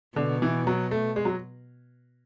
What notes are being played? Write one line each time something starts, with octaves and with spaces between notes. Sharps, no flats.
B2 D3
E3
F#3
A3
G#3
F#3